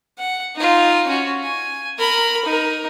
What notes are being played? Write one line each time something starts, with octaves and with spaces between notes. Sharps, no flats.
F#5
D#4 F4
C#4 F#4
G#5
A#4 B5
D#4 A#4